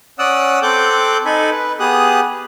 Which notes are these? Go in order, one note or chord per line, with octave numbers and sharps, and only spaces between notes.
C#4 D5 F#5 D#6 E6 F#6
C4 A4 G5 D6 F#6 G6
D#4 A4 G#5 B5
B4
B3 G4 G#4 D#6 F#6